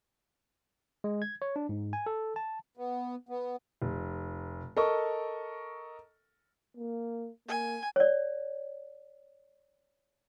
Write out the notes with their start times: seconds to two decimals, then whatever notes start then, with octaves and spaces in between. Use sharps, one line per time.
1.04 G#3
1.22 G#6
1.42 C#5
1.56 D4
1.69 G#2
1.93 G#5
2.06 A4
2.36 A5
2.77 B3
3.29 B3
3.82 F1
4.77 A4 A#4 D#5 C#6
6.77 A#3
7.48 A#3 G#5
7.96 C#5 D5